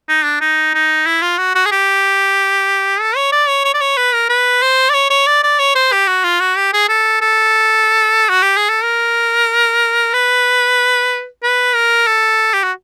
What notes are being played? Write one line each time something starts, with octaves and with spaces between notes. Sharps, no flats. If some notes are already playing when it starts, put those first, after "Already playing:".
D#4
D4
D#4
D#4
E4
F4
F#4
F#4
G#4
G4
A4
C#5
D5
C#5
C#5
D5
C#5
B4
A#4
B4
C5
D5
C#5
C#5
D5
D5
C#5
C5
G4
F#4
F4
F#4
G4
G#4
A4
A4
F#4
G4
G#4
A4
A#4
B4
B4
A#4
A4
G4
F#4